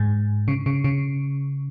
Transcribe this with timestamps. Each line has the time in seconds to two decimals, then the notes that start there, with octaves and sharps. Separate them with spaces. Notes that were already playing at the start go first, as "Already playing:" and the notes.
Already playing: G#2
0.48 C#3
0.66 C#3
0.84 C#3